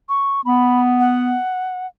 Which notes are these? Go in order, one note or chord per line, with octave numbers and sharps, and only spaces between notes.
C#6
B3 B5
F#5